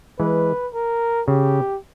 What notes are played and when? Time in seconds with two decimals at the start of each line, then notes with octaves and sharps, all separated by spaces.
0.18 E3 G#3 B4
0.73 A#4
1.28 C#3 G4